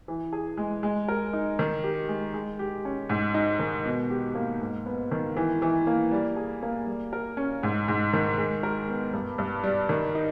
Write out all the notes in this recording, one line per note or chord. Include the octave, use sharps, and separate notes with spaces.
E3
G#4
G#3
G#3
A#4
D#4
D#3
G4
G#3
G#3
G4
C#4
G#2
D#4
D#3
B2
G4
A#3
G#2
B3
D#3
E3
E3
A#3
G3
G#4
A#3
G3
A#4
C#4
G#2
G#2
D#3
G#3
A#4
B3
G2
G2
G3
D#3
D#4